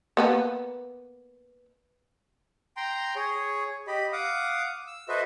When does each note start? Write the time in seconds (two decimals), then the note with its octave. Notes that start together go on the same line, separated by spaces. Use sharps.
0.17 A#3 B3 B4
2.77 G5 A#5 C6
3.16 G#4 C#5
3.87 G4 D#5 B5
4.13 F5 F#5 D6 D#6
4.87 E6
5.09 F#4 A4 B4 C5 D#5 E5